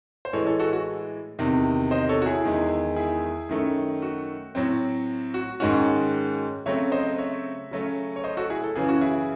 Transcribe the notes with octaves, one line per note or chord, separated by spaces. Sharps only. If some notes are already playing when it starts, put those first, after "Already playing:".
C5
A2 E3 G#3 A4 C#5
A4 C#5
F#4 A4
F#4
E2 C3 D#3
C5 D#5
A4 C#5
F#4
E4 G#4
E2 D#3 G#3
E4 G#4
F#2 D#3 A3
F#4
A2 F#3 C4
F#4
G#2 D#3 G#3 C#4 F#4
C#3 F#3 A3 C4 C#5 E5
C5 D#5
C#5 E5
C#3 F#3 A3 C#4
C#5
C5 D#5
F#4 A4
E4 G#4
A4
F#2 C#3 E3 G#4
F#4
E4 G#4